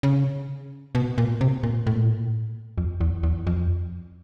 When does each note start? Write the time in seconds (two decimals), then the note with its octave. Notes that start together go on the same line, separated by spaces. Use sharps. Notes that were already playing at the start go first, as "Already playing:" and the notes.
0.03 C#3
0.95 B2
1.18 A#2
1.41 C3
1.63 A#2
1.87 A2
1.96 A#2
2.05 A2
2.78 F2
3.01 E2
3.23 E2
3.47 F2